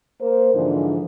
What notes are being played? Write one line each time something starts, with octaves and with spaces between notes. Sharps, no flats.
A#3 A#4 C5
G#2 D3 E3 F3 D4